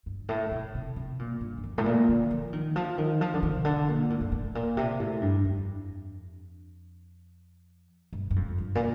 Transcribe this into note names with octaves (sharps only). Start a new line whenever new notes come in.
G2
A2
A#2
C3
C3
A#2
G2
G2
F2
A2
A#2
D3
F3
D#3
F3
D#3
F3
D3
D#3
C3
D3
A#2
A2
G2
A2
A#2
C3
A2
G2
F2
G2
G2
F2
G2
A#2